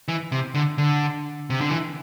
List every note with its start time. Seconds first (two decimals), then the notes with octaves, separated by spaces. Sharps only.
0.08 E3
0.32 C3
0.55 D3
0.78 D3
1.50 C3
1.61 D3
1.70 E3